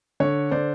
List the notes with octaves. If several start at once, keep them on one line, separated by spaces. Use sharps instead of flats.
D3 C#5
D3 C5 D5